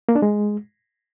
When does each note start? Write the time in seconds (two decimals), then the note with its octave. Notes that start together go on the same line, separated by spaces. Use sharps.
0.09 A#3
0.15 D4
0.22 G#3